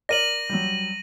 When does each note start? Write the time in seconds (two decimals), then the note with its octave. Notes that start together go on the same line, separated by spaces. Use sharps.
0.09 A#4 D5 A#6 D#7 F#7
0.50 F#3 G3